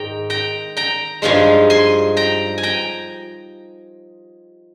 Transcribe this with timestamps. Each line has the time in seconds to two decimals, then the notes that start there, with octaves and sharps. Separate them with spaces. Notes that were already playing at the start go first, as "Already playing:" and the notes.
Already playing: G#2 D#3 D#4 G5 A#5
0.30 G5 A#5
0.77 G5 A#5
1.22 G2 F3 G#3 D#4 F5 G#5
1.70 G#5 C6
2.17 G5 A#5
2.58 G#5
2.63 G5 A#5